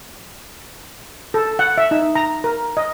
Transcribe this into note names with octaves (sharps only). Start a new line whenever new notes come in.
A4
F#5
E5
D#4
A#5
A#4
D#5